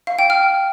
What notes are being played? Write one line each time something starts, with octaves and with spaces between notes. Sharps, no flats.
F5
G5
F6